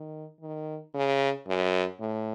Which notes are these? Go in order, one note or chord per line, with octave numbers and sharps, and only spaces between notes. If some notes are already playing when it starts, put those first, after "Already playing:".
Already playing: D#3
D#3
C#3
F#2
A2